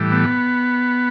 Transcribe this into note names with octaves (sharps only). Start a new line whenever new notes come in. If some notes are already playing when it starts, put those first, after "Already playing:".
Already playing: A2 E3 G3
B3